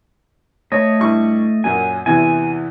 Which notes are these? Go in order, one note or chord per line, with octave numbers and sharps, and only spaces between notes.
A3 C#5 D#5
G2 E4 C#6
F#2 A#2 F#3 G#5
E2 C3 E3 G#5